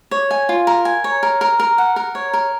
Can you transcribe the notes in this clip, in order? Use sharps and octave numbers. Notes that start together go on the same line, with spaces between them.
C#5
G#5
F4
A#4
G#5
C#5
A#4
A#4
A#4
F#5
A#4
C#5
A#4